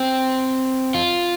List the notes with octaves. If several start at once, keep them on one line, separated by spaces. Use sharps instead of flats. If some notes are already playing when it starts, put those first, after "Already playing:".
Already playing: C4
F4